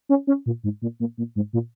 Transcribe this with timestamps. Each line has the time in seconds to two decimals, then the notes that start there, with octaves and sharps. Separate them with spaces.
0.09 C#4
0.27 C#4
0.46 A#2
0.64 G#2
0.82 A#2
1.00 A#2
1.18 A#2
1.36 G#2
1.53 A#2